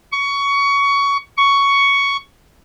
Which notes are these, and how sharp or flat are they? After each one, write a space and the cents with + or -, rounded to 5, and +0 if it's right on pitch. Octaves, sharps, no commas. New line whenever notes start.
C#6 +20
C#6 +10